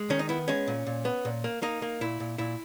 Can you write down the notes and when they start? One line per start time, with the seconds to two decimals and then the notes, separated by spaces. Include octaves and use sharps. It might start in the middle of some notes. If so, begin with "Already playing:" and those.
Already playing: G#3
0.10 D#3 C#4
0.19 D#4
0.29 B3 E4
0.48 G#3 C#4
0.68 A#2
0.87 A#2
1.05 B3
1.25 A#2
1.44 A#3
1.62 A#3 D#4
1.82 A#3
2.01 A#2 E4
2.20 A#2
2.38 A#2 E4